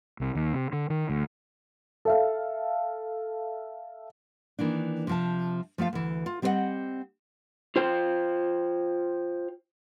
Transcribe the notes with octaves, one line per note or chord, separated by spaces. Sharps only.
C2
D#2
C3
D3
D#3
D2
A4 E5 F5
D#3 E3 A#3 D4
C3 F3 A5
F3 A3 F4 F5
D2 E3
F4
G3 C4 G4 C5 D#5 F#5
F4 C5 G5